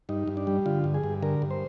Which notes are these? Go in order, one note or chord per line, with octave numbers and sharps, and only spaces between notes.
G2 D#4
G2
D4
G3
D3 F4
G2
G#4
G2
D3 A#4
G2
C5